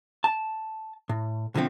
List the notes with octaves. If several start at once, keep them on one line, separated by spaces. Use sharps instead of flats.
A5
A2
B1 D3 F3 A3 C4